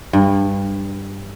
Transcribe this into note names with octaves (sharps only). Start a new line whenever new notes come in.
G2